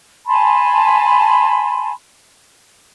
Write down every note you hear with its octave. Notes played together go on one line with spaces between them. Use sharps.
G#5 A5 B5 C6